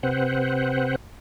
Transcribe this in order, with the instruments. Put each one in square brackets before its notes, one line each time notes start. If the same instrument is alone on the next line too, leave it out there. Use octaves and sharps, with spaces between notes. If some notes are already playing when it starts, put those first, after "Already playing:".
[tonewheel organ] C3 C4 B4 C5 F#5